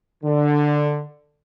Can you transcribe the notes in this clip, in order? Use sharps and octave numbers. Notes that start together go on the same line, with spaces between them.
D3